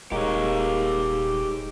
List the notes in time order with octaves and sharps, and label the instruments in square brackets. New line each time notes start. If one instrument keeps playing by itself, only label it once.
[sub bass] D#1 [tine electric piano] G#3 D#4 [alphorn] A#3 [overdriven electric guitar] G4 C#5